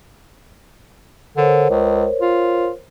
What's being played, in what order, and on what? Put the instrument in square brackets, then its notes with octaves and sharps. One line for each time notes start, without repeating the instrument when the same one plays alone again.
[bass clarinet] D3 [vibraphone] A#4 C5 C#5
[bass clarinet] C#2
F4